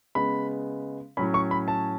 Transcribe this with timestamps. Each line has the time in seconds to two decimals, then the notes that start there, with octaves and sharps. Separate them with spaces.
0.15 C#3 G#3 B3 B5
1.17 A2 F#3 C#4 B5
1.34 C#6
1.51 B5
1.68 A5